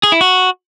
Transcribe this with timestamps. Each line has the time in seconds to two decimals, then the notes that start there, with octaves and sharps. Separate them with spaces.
0.03 G#4
0.12 E4
0.21 F#4